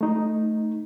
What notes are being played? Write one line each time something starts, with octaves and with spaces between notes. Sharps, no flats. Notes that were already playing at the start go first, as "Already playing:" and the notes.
A3 D#4